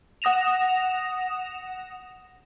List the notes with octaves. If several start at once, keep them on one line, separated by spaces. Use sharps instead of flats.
F#5 D#6 A#6 E7 F7